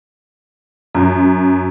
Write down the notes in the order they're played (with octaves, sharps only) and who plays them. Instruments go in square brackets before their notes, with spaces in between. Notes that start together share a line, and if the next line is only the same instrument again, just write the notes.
[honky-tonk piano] F#2